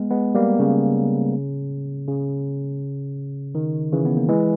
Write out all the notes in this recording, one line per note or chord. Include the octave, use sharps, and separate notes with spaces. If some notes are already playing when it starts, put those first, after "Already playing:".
Already playing: G#3 B3
G#3 B3
G3 A#3
C#3
C#3
D#3
C#3 E3
B3
A#3
E3 G#3